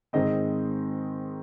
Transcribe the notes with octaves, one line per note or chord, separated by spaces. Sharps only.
G#2 D#3 G#3 C4 D#5